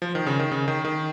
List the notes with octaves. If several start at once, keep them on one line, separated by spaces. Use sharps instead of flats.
F3
D#3
C#3
D#3
C#3
D#3
D#3